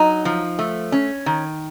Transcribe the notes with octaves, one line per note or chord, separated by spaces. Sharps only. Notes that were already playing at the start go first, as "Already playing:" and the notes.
Already playing: F#3 D#4
F3
A3
C#4
D#3